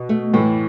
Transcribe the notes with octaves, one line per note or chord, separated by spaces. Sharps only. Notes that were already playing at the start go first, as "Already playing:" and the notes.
Already playing: B2
A3
A2 E3